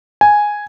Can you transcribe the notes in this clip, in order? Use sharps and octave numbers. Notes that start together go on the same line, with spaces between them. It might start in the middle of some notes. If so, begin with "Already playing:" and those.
G#5